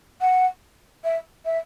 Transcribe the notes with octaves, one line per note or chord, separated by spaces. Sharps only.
F#5
E5
E5